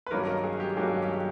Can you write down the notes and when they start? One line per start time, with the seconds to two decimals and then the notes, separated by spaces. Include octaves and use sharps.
0.07 B4
0.11 G2 D#3 F#3 A#3 C#4 A#4
0.27 A#4
0.44 G#4
0.60 G4
0.77 G2 D#3 F#3 A#3 C#4 G#4
1.02 G4
1.09 G#4